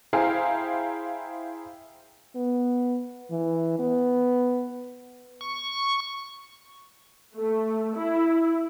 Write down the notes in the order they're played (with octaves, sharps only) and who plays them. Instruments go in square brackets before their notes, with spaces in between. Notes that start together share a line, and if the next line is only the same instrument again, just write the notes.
[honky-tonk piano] E4 G#4 C5 F5 G5 A#5
[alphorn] B3
E3
B3
[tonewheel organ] C#6
[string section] A3
E4